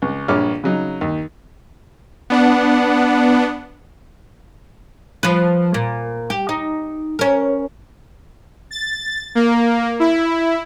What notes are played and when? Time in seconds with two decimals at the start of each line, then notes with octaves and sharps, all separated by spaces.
0.02 C#2
0.28 A#1 G2 C#5 D6 F6
0.64 C#3 F#3 D#4
1.01 D#2
2.30 B3 D4 F#5
5.23 F3 B4
5.74 A#2
6.30 G4
6.49 D#4
7.19 C#4 A#4
8.71 A6
9.35 A#3
10.00 E4